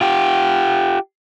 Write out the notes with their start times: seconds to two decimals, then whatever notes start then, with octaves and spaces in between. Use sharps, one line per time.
0.01 F4 G4